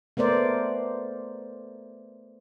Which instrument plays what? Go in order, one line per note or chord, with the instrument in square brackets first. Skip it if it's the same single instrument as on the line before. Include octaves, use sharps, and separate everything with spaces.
[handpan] A3 B3 A#4 C5 D5